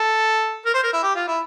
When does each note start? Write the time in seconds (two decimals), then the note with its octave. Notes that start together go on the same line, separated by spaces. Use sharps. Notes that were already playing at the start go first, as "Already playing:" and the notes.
Already playing: A4
0.65 A#4
0.74 C5
0.83 A#4
0.93 E4
1.03 G4
1.15 F4
1.27 E4